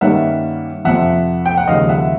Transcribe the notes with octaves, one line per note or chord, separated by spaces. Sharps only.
G2 D#3 G3 A#3 C#4 E5 F#5
F2 C3 F3 E5 F#5
G5
F#5
D#2 C#3 F3 G#3 D#5 F5
E5 F#5